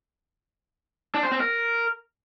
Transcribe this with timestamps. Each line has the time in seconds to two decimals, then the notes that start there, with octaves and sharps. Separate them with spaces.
1.15 D4
1.23 C5
1.32 C4
1.40 A#4